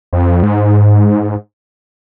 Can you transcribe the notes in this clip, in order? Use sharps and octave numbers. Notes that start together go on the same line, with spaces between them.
F2
G#2